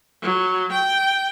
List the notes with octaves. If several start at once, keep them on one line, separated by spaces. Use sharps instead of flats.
F#3
G5